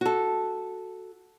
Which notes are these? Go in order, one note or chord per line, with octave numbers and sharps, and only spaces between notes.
F#4 A4